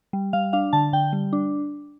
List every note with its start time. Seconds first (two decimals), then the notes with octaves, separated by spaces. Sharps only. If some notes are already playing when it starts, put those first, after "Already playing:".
0.13 G3
0.33 G3 F5
0.53 D4 F5
0.73 D3 A5
0.93 D3 G5
1.13 G3
1.33 D4